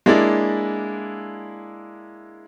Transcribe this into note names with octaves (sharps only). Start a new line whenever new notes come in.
G#3 A#3 D4 E4 A6